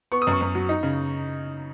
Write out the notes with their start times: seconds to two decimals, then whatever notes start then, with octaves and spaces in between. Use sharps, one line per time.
0.12 B3 C#6
0.22 D#6
0.27 F#2 C#6
0.41 F#2
0.55 F#3
0.69 D#4
0.83 C#3